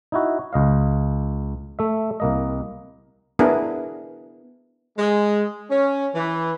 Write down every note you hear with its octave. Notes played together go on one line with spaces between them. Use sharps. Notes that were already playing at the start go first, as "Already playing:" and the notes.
D#4 E4 F#4
C#2 D#5 F5
A3 E5
C2 A#3 D#5
B3 D4 E4 G#4 A#4
G#3
C#4
E3